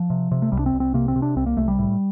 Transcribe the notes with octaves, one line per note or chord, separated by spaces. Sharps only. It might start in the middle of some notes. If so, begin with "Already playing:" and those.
Already playing: F3
C3
C3
A3
C2 G3
D4
C4
C2
C4
C3 A#3
C4
C3
D4
C2 C4
A#3
C2 A3
G3
A2